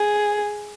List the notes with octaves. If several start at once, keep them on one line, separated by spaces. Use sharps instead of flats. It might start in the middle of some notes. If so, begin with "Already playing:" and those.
Already playing: G#4